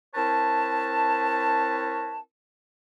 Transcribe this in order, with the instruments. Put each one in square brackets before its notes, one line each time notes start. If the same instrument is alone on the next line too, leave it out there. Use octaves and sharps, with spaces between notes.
[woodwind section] C4 E4 A#4 B4 C#5 A5